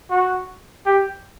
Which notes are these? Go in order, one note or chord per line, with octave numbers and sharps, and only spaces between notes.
F#4
G4